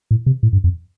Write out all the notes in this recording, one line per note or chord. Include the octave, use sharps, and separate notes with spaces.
A2
C3
A2
G2
F2